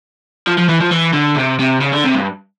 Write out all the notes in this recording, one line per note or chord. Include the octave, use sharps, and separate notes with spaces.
F3
F3
E3
F3
E3
D3
C3
C3
C#3
D3
C3
G2